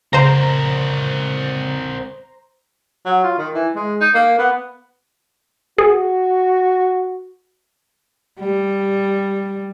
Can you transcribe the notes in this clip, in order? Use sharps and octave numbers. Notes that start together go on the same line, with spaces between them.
C#3 C4 A#4 C5 A#5
F#3
F4
D#3
E3
G#3
D#4
A#3
B3
F#4 G#4
G3